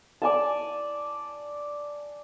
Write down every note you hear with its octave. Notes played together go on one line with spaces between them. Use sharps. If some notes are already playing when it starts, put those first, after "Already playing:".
D5 G#5 A5